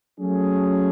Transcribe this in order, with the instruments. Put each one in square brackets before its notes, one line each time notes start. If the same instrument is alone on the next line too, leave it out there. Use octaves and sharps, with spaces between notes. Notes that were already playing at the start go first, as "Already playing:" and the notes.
[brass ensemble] F#3 A3 C#4 G#4